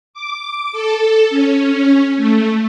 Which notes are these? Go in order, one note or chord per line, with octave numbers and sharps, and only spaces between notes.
D6
A4
C#4
A3